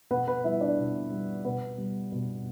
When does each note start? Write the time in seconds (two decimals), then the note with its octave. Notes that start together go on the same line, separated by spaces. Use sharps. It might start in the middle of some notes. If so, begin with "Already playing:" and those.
0.11 B2 B3 B4
0.27 B3 B4
0.44 G3 E4 E5
0.61 D4 D5
0.78 B2
1.11 G3
1.45 B2 B3 B4
1.78 G3
2.12 B2